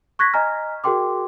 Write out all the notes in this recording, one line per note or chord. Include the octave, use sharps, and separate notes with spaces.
C#6 F#6 G#6 A#6 B6
D#5 G#5 A#5 F6
F#4 G#4 A#4 G5 C6 D6